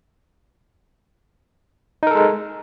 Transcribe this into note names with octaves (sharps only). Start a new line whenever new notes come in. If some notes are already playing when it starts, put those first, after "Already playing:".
G#3 D#4 A4 A#4